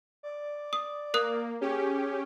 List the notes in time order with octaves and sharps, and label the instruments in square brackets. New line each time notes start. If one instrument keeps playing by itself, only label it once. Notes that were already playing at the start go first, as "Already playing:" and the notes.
[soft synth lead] D5
[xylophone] D#6
[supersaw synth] A#3 [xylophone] A#4 D#6 F#6
[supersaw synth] C#4 G4 [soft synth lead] G#4